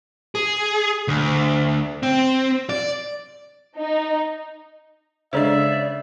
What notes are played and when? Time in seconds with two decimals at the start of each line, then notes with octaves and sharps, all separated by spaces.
0.35 G#4
1.08 D2
2.03 C4
2.69 D5
3.78 D#4
5.33 C#3 G#3 D4 A4 C5 D5 E5